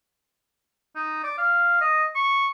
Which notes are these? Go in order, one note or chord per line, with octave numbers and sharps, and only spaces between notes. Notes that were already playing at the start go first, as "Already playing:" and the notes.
D#4
D5
F5
D#5
C#6